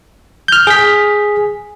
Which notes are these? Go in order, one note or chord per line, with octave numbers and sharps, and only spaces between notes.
F6 G6
G#4 B6